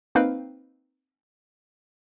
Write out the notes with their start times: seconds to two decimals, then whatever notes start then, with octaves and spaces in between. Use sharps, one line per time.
0.15 A#3 C4 D#4 B4 F5 G5